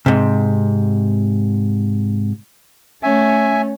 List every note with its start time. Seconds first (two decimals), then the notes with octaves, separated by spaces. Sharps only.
0.06 G#2 C3
3.03 A3 C#4 E5 G#5